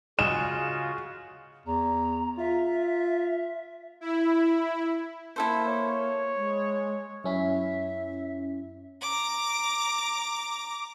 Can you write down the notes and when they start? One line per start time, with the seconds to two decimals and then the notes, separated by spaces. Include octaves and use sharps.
0.19 C#3 G#3 F4 F#4 E7
1.66 E2 A#5
2.38 F4 E5
4.01 E4
5.36 A#3 E4 A4 C5
5.67 C#5
6.35 G#3
7.24 F#2 C#4 E4 E5
9.01 A#5 D6